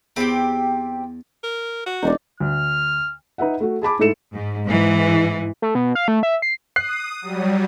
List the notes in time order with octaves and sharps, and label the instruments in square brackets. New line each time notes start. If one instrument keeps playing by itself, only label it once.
[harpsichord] E2 B5 [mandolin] C4 G4
[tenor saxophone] A#4
F#4
[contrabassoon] E1 [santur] D#4 D5
[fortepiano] D2 [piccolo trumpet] F6
[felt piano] D#4 B4 E5 F#5
A3 F#4
G#4 A5 B5 D6
G#2 A3 E4 A4 C#7 E7
[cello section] G#2
G#2 E3
[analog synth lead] A3
B2
F5
A3
E5
C7
[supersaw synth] D#6 [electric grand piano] F#6 C7
[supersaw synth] F#3 G3